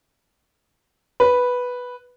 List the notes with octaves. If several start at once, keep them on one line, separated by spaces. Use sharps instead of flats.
B4